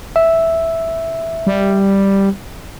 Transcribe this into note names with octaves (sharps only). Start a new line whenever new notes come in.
E5
G3